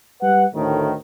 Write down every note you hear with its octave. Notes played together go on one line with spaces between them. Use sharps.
G3 B4 F#5
D2 A2 D#3